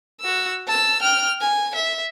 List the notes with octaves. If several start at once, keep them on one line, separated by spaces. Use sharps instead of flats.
F#4 E6
A5 E6
G5 F6
G#5
E5